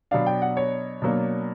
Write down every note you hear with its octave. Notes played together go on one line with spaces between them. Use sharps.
B2 F#3 B3 D4 F5
G5
F#5
C#5
B2 F#3 A#3 D4